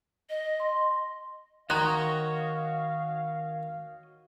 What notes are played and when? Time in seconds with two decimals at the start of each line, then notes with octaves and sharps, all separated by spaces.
0.30 D#5
0.60 C6
1.70 D#3 F#4 C#5 D#5 F5 A#5 C6 F#6